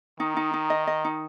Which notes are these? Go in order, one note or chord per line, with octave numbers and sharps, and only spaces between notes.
D#3 D#4
D#4
D#4
D#5
D#5
D#4